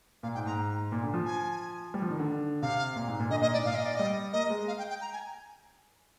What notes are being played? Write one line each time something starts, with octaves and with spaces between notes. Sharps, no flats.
A#2 F5
G#2 G5
G#2 A#5
A#2
D3
F3
G#5
G3
F3
D#3
D3
C3 F5
A#2
G#2
A#2
D3 D#5
A#2 D#5
G#2 D5
A#2 F5
D#5
D5
G3 D#5
A#3 D#5
G#3
F5
G5
G5
A#5
G#5